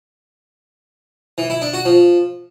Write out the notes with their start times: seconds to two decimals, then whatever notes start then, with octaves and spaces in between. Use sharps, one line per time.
1.38 E3
1.50 E4
1.62 D4
1.74 F#4
1.85 F3